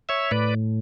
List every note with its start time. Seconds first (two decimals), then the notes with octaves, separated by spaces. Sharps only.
0.09 C#5 E5
0.31 A2 B4 D5